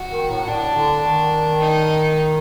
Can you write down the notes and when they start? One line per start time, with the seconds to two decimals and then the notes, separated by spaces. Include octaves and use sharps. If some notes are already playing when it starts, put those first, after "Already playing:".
Already playing: F#4
0.10 D#3
0.29 A2
0.47 A2 D4
0.75 D3
1.03 D#3
1.59 D#4